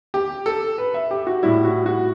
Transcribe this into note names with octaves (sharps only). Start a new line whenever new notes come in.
G4
A4
B4
E5
G4
F#4
A2 G3 E4
F#4
F#4